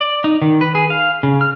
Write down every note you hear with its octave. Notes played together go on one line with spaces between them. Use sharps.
D5
D#4
D#3
B4
G#4
F5
C#3
F6